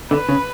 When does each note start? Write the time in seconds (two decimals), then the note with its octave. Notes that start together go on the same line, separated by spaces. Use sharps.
0.11 D3 B4
0.29 C#3